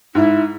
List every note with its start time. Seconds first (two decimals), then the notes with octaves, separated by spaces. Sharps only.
0.15 G#2 E4